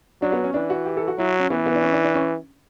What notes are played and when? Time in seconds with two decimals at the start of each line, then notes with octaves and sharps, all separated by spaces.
0.22 F#3 D4
0.32 B3
0.44 C#4
0.54 E3 D4
0.70 F#4
0.86 G4
0.97 A4
1.08 F#4
1.18 F#3 E4
1.40 C#4
1.50 E3 B3
1.66 B3
1.75 D4
1.82 C#4
1.93 D4
2.04 D4
2.14 C#4